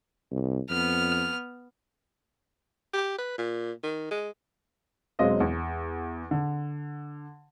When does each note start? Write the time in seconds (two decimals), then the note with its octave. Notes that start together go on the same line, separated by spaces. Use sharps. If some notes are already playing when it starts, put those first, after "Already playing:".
0.31 C2
0.70 F2 B3 F6
2.94 G4
3.19 B4
3.38 A#2
3.83 D#3
4.11 G#3
5.19 E1 F#3 G#3 C4 D#5 F5
5.40 E2
6.31 D3